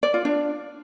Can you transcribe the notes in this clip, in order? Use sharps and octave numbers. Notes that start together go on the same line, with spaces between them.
D5
F4
D4